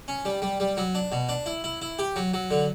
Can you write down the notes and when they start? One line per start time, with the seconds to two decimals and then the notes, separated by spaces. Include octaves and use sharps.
0.08 C#4
0.25 G3
0.42 G3
0.60 G3
0.77 F#3
0.95 D4
1.12 B2
1.29 D4
1.46 E4
1.64 E4
1.82 E4
1.99 G4
2.16 F#3
2.34 F#3
2.51 D3